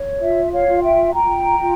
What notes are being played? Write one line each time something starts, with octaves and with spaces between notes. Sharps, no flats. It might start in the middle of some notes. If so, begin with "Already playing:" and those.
Already playing: C#5
F4 E5
C#5 F5
F4
E5 G5
F4 G5 A#5
F4